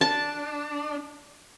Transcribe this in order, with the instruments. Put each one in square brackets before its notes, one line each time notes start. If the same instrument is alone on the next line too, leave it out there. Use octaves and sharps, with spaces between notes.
[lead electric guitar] D4 [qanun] A5